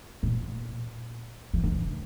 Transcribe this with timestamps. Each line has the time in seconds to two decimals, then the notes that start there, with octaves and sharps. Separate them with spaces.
0.23 A#2
1.54 E3
1.64 D3
1.72 C#3